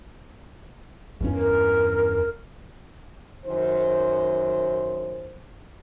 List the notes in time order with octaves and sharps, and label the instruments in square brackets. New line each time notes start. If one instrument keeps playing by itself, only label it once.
[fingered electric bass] E2 G2 C#4
[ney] A#4
[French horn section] F#2 D#3 C5